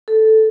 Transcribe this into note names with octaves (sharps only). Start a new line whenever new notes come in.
A4